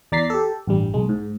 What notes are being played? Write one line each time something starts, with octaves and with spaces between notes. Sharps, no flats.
E2 D5 A#5 A6 B6 C7
G4 A4
A1 G2 G3
B1 G#3
G#2